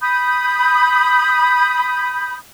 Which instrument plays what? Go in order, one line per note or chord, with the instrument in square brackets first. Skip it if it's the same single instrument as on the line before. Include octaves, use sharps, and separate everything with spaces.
[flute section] B5 D#6 G6